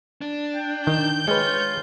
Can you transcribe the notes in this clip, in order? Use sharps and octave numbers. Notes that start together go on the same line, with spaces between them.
D4
G5
D#3 G6
G#3 F4 B4 C#5